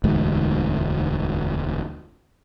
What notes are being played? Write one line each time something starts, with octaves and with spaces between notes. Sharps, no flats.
E1 D2 G#2